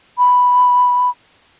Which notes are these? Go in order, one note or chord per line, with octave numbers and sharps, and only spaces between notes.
B5